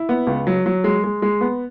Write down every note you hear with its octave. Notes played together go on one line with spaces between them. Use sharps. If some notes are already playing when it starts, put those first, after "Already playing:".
Already playing: E4
B3
C#2
F#3
F#3
G#3
G#3
G#3
B3